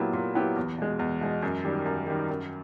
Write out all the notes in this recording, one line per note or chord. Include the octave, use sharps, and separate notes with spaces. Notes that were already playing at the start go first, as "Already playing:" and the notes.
Already playing: A#2 F#3 B3 E4 G4
A#2
F#3 B3 E4 G4
E2
B2 G#3
E2
B2 G#3
F#2
D#3 G3
F#2
D#3 G3
F#2